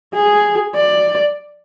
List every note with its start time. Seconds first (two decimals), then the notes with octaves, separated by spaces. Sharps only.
0.13 G#4
0.75 D5